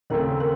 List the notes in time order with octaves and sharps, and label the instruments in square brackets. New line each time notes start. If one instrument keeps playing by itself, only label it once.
[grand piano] D#2 C#3 A3 C4 [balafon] A#4
[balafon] A#4